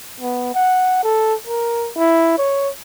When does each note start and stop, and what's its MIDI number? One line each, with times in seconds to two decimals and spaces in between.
0.21 0.51 59
0.54 0.98 78
1.03 1.34 69
1.48 1.89 70
1.96 2.35 64
2.38 2.69 73